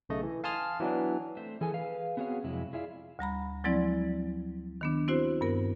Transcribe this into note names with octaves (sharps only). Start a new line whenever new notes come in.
B1 C#3 A3 D#5
E3
F5 G#5 A5 C6 D#6 F6
E3 F#3 B3 D4
A3 C4 C5 E5
E3 G#4 A4 G#5
G#4 B4 F5
B3 C4 F#4 G#4 C#5 F5
F2 C3 F#3 G#3 E4
E4 F4 G#4 D5 E5 F5
D2 G3 A#5 B5
F3 F#3 G#3 C4 E4 D5
D#3 B3 D4
C4 E4 F#4 C5
G2 B3 A#4